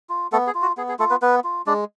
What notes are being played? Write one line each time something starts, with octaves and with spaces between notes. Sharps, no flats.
F4
A3 B3 A4
G#4
F4
F#4
B3 G#4
G#4
A3 F4 A4
B3 B4
B3 B4
F4
G#3 D4 D5